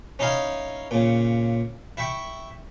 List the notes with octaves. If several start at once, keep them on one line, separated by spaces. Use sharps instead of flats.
C#4 D#4 E4 D#5 F5 G#5
A#2 C#3
E4 E5 G5 C#6